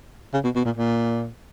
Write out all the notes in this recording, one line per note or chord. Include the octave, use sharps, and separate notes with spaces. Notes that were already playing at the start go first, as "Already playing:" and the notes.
C#3
B2
B2
A#2
A#2